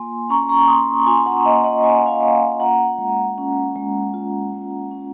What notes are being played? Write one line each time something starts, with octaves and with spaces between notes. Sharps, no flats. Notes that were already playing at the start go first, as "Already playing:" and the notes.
Already playing: A#3 F4 G#5 C6
C#4 A#5 C#6
A#5 C#6
A#3 C6 D#6
F4 G#5 C6
F#5 A#5
A#3 D#5 F#5
D#5 F#5
C#4 G#5
F#5
F5 G#5
A#3
F4 F#5 A#5
G#3
C#4
G#3
F4
G#3
C#4